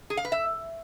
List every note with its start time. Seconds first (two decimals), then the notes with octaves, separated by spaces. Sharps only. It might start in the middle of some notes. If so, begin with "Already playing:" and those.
0.10 G#4
0.17 F5
0.25 B4
0.32 E5